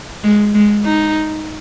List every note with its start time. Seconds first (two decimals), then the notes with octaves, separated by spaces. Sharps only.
0.24 G#3
0.54 G#3
0.85 D#4